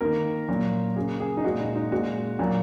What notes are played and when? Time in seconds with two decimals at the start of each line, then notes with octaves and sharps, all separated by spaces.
0.01 D#3 A#3 A#4
0.48 A#2 F#3 A#3
0.96 C#3 A#3 G#4
1.20 G#4
1.37 D#4
1.44 A#2 G#3 F#4
1.60 D#4
1.76 D#4
1.91 A#2 G#3 F#4
2.39 A#2 F#3 A#3